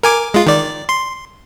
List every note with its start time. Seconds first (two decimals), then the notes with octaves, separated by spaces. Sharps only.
0.03 A#4 G#5 D6
0.34 G#3 F4
0.46 D#3 D5
0.89 C6